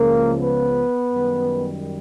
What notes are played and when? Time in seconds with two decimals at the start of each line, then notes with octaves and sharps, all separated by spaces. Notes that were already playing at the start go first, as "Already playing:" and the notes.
Already playing: C#2 C#3 F3 A#3 A#4
0.39 B3 B4
1.12 F#2 D#3 G3